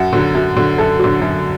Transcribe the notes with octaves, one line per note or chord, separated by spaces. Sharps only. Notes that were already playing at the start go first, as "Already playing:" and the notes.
Already playing: F#2 F#5
D3 F#3
F#2
D3 F#3
F#2 A4
D3 F#3
F#2